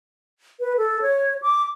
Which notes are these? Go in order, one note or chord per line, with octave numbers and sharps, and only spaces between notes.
B4
A4
C#5
D6